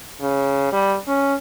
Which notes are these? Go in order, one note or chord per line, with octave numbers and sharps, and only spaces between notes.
C#3
G3
C#4